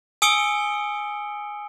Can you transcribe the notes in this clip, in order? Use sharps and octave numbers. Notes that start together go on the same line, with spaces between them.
G#5 D#6 E6 C#7 D7 G7